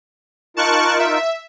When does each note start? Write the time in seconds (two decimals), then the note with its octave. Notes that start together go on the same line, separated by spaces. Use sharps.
0.57 D#4 F4 A#4 A5 C#6 F#6
0.99 E5